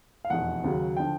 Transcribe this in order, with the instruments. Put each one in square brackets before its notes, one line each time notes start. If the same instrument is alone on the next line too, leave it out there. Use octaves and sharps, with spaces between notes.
[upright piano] F5
F1 E2 B2 F#5
D#2 C#3 F#3
D3 F3 G5